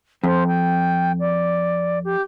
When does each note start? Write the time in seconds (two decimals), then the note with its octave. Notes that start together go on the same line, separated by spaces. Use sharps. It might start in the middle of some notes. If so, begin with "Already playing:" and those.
0.23 F2 C5
0.47 G5
1.20 D5
2.04 G4